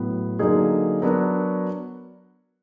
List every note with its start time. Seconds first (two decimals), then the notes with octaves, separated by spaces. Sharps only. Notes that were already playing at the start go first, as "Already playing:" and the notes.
Already playing: A2 F#3 B3
0.39 D3 F#3 A#3 D#4 G#4
1.02 F#3 B3 D4 F#4 A#4